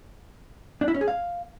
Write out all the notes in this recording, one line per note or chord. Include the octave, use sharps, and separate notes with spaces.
D4
E4
C#4
G#4
F5